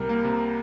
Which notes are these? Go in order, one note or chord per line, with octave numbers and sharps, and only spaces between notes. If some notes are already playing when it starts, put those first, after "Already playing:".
Already playing: C2 C3 G3 A#4
A#3
C3